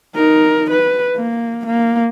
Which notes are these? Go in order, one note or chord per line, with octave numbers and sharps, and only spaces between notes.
D#4 A#4
B4
A#3
A#3